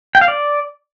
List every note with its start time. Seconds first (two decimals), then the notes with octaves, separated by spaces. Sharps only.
0.15 G5
0.21 F5
0.28 D5